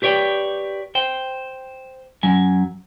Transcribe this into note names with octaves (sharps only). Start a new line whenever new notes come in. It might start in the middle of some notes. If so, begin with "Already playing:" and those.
G4 B4 C#5 D5 G5
C5 G5
F#2 F#3 G#5